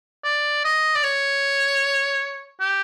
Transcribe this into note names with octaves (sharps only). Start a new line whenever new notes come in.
D5
D#5
D5
C#5
G4